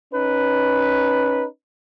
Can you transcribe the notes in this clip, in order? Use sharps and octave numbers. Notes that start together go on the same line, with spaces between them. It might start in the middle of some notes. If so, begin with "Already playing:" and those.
C#4 D#4 B4